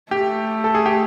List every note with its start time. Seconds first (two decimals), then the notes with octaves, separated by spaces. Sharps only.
0.11 A3 G4
0.64 A4
0.75 G#4
0.86 G4